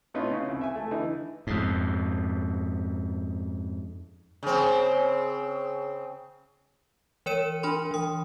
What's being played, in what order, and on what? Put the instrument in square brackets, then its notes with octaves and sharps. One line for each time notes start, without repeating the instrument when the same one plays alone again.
[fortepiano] A2 B3 C#4 D#4 F4
C#3
C2
E5 G#5
A3
D3 E3 D#4
[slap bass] F2 G#2
[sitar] C#3 C4
[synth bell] E3 A#4 C#5 D#7
D4 A#4 B5 C6
E3 D#6